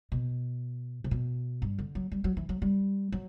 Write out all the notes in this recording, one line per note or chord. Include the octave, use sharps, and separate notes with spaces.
B2
C3
B2
G2
D3
F#3
G3
F#3
E3
F#3
G3
F#3